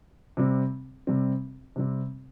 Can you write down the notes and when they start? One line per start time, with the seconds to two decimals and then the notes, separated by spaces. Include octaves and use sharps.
0.37 C3 G3 C4
1.07 C3 G3 C4
1.76 C3 G3 C4